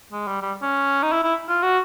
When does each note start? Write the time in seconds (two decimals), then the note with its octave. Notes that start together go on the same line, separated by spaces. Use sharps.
0.12 G#3
0.27 G3
0.42 G3
0.62 C#4
1.03 D#4
1.13 E4
1.23 E4
1.48 F4
1.63 F#4